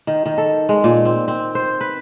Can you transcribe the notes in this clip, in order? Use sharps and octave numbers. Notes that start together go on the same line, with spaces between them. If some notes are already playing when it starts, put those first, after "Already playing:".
D#3
D#3
A4
G#3
A#2
C4
C4
C5
B4